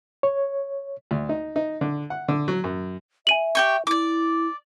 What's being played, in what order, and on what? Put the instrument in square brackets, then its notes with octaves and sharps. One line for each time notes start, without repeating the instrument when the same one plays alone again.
[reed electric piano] C#5
[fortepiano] D2
D#4
D#4
D3
F#5
D3
F#3
F#2
[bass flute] E5 [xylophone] G#5 D#7 F#7
[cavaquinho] G4 G5 C#6
[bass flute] E4 [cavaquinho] D5 D6